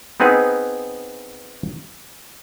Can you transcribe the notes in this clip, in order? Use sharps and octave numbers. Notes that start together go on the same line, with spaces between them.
B3 C4 D#4 G#4 B4